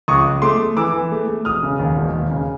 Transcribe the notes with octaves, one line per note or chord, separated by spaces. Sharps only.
C#2 C#6 D#6
C#2
A3 C6 D6
A3
E3 D6 E6
E3
A3
A3
E1 D#6 F6
C#3
D#2
E1
D#2
C#3